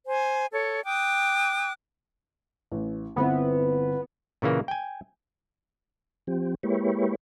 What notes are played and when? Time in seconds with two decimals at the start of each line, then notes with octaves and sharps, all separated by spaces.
0.06 C5 G#5
0.53 A4 C#5
0.84 G5 D6 D#6 F#6
2.72 A1
3.16 G1 B3 C4 E4
4.42 A#2 C#3 E3 A#3
4.68 G5 G#5
6.27 F3 C4 G4
6.63 G#3 A#3 E4 G4 B4 C#5